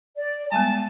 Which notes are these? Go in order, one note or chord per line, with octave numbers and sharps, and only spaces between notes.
D5
G3 G#3 B3 G#5 A5